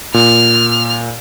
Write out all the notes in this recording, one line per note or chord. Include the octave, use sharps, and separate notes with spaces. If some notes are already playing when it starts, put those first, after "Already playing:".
A#2 F6